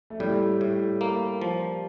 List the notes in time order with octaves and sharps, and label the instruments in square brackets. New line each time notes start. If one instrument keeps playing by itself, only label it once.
[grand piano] A3
[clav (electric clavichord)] A2 [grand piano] G3
[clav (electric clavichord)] A2
A#3
F3